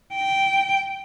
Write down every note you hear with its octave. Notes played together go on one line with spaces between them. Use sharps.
G5